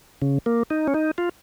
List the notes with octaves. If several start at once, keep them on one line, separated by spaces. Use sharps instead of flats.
C#3
A#3
D#4
C#4
D#4
F4